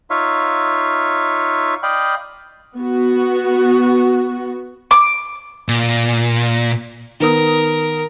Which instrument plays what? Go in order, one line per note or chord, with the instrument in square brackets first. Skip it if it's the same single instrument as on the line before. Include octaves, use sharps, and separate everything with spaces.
[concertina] D#4 F4 C#5 E5 F5
D5 D#5 F5 G5 B5
[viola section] B3 F#4
[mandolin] D6
[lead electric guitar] A#2
[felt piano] D#3 B3 D#6 [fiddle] A#4